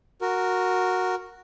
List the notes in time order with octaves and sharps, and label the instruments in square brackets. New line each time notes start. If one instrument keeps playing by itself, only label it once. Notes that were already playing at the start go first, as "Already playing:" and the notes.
[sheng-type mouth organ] F#4 A#4